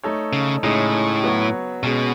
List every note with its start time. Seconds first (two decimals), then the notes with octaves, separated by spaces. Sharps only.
0.04 A3 D#4 A4 C#5
0.33 C#3
0.63 A2 C#3 G#3 D#4 G#4 C#5
1.23 F#3 B3 F#4 C#5
1.83 B2 G#3 C#4 G#4